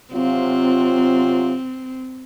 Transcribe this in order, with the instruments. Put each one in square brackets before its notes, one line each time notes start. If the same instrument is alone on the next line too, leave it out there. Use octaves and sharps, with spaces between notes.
[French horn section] C3 F#3 F4 [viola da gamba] C4